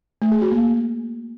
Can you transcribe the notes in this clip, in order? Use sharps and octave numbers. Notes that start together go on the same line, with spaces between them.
A3
G#4
F#4
A#3